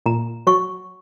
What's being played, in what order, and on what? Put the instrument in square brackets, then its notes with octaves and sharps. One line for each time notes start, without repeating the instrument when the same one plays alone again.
[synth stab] A#2 [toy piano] A#5
[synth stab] F#3 [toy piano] C#6